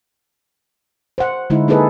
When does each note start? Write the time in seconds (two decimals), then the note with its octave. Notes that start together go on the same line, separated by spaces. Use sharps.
1.18 C5 F#5
1.50 D3 G#3 D#4 E4
1.68 A#3 D#4 E4 G#4 A4 B4